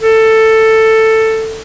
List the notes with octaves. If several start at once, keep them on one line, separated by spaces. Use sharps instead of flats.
A4